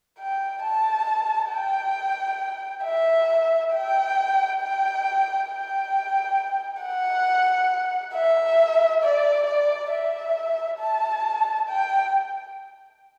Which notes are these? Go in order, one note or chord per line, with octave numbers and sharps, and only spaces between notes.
G5
A5
G5
E5
G5
G5
G5
F#5
E5
D5
D5
E5
A5
G5